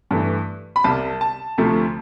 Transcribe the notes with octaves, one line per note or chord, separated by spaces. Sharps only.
G2 E3 A3
B5
C2 C3 G3 A5
A5
D2 C3 F3 A3